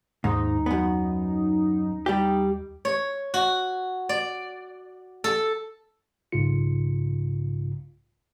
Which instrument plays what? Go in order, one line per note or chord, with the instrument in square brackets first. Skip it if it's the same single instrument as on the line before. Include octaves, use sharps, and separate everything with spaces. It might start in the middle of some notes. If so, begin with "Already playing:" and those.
[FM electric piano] D#2 [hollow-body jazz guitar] G#2 [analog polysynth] D#4
[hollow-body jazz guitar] F#2 B3
G3 G4
[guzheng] C#5
F#4
D5
A4
[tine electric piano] B1 G#2 C#3 F4 C#7